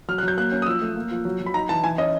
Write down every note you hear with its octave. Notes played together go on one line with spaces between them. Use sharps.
F#3 F6
F#6
F#3 G6
A#3 F#6
C#4
D#6
F3 E6
A3
A#3
F3
F#3
F#3
B5
D#4 A#5
E3 A5
E3 G#5
C#4 D#5